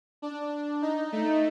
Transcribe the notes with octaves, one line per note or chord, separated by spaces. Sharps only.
D4
D#4
A3